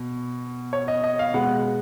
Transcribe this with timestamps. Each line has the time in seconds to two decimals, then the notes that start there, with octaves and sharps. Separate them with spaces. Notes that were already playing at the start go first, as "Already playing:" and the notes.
Already playing: B2
0.73 C#5
0.88 D#5
1.04 D#5
1.19 F5
1.34 B2 G#3 B3 F#5